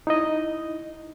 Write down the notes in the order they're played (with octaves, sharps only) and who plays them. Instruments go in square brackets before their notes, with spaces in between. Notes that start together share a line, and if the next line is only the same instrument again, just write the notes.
[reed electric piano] D#4 E4 D#5